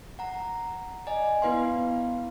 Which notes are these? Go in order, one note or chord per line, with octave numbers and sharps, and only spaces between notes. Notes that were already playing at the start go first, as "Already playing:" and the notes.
F#5 A#5
D5 D#5 G#5
B3 E4 B4 F5 C6